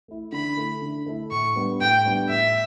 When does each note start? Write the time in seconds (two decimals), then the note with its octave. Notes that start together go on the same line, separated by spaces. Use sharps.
0.08 A3 E4
0.32 D3 B5
0.57 A3 E4
0.82 D3
1.06 A3 E4
1.31 A2 C#6
1.56 G3 B3 D4
1.81 A2 G5
2.06 G3 B3 D4
2.29 A2 E5